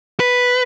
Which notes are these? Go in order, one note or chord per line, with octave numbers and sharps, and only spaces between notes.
B4